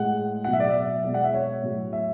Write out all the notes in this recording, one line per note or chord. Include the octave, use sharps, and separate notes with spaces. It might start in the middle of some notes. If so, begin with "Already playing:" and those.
Already playing: A2 G#3 F#5
B2 F#3 F#5
E5
D5
E5
B2 G#3 D5
F#5
E5
C#5
A2 F#3
E5